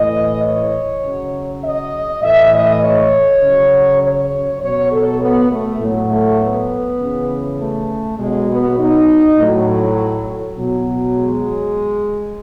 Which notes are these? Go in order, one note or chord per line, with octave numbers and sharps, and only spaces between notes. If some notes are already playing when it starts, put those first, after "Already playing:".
Already playing: A2 E3 D#5
C#5
C#3 F#3
D#5
A2 E3 E5
D#5
C#5
C#3 F#3
C#5
B2 F#3 C#5
A4
B3
A3
A2 F#3
A3
B3
C#3 E3
A3
B2 F#3 G#3
B3
D#4
A2 F#3
B2 F#3
G#3